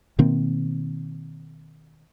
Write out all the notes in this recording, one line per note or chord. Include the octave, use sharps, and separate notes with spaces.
B2 D#3 A#3 C4